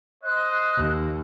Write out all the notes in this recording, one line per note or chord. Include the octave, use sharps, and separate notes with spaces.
C5 D#5 F#6
D#2